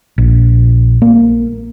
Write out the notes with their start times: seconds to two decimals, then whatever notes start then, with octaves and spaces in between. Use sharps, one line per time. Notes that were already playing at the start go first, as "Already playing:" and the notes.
0.18 A#1
1.02 A#3